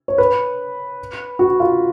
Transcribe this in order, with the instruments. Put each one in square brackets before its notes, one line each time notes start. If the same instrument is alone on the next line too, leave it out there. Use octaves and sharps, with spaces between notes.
[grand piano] C#5
B4
F#4
F4